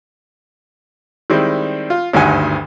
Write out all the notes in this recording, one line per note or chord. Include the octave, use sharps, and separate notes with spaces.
D#3 G3 G#3 C4 E4
F4
G#1 D2 G2 D#3 F#5 G#5